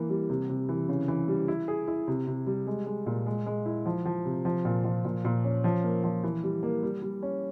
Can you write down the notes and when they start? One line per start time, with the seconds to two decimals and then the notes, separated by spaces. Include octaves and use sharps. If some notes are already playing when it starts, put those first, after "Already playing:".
Already playing: E3 A#3
0.10 G3
0.30 C3
0.49 C3
0.69 E3
0.89 C#3
1.08 E3
1.28 G3
1.48 E4
1.68 G#4
1.88 E4
2.08 C3
2.27 C3
2.47 G3
2.67 G#3
2.86 G#3
3.06 A#2
3.26 G#3
3.46 G#3
3.66 E4
3.86 F3
4.05 F3
4.25 C3
4.45 F3
4.65 A#2
4.84 F3
5.05 A#2
5.25 A#2
5.44 C#4
5.64 F3
5.84 A#3
6.04 F3
6.24 E3
6.44 G3
6.63 A#3
6.83 G3
7.02 G3
7.23 C#4